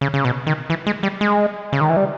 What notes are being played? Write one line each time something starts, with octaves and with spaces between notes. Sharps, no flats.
C#3
C#3
B2
D#3
E3
G#3
G3
G#3
C#3
D#3
E3
G3